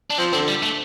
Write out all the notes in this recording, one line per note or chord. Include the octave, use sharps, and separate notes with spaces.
D4
F3 C4
D3 C4
G3
A3